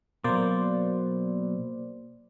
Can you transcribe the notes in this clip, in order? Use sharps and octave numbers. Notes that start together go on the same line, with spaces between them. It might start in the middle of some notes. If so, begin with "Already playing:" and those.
B2 F#3 A#3 C5 D5